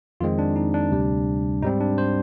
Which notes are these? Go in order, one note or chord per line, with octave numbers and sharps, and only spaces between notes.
F2 D#3 G#3 C4 F4
D4
D#4
D4
D2 C3 G3
G#2 G3 C4 D#4
D4
C5